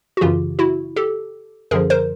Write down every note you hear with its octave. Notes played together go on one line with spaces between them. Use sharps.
F#4
F#2 C#3 E3 F4 G4
E4 F#4
G4 A4
F#2 D3 F3 G#4 A#4
A#4 C5